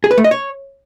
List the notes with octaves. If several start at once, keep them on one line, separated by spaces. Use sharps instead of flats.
G#4
B4
A3
D#5
C#5